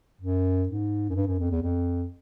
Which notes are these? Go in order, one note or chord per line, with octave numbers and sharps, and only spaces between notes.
F#2
G#2
F#2
G2
F#2
F2
E2
F2